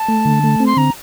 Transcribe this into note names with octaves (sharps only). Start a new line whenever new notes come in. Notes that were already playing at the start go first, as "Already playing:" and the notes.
Already playing: A5
A3
D3
A3
C4
C6
D3 A#5